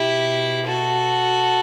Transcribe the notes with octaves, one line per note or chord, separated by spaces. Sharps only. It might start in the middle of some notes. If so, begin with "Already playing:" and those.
Already playing: B2 E4 G4
F#4 A4